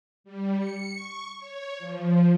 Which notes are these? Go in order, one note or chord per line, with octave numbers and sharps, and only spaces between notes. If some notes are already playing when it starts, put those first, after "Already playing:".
G3
C#7
C#6
C#5
F3